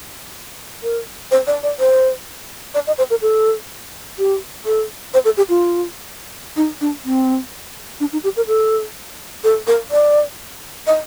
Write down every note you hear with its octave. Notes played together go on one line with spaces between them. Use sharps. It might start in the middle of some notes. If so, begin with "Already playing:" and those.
A#4
C5
D5
D5
C5
D5
D#5
C5
A#4
A4
G4
A4
C5
A4
G4
F4
D#4
D4
C4
D4
D#4
G4
A#4
A4
A4
A#4
D5
D#5